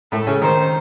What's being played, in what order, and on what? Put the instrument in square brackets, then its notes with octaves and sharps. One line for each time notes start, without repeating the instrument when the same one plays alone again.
[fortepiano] A2 A3 [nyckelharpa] A4
[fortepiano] C#3 C#4
[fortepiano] D#3 D#4 [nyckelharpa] C5